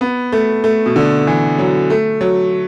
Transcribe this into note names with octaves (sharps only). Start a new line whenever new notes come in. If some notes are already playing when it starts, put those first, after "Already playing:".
B3
A3
A3
B2
D3
E3
F#3
A3
F#3